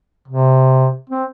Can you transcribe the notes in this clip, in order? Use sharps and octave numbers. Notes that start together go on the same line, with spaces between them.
C3
C4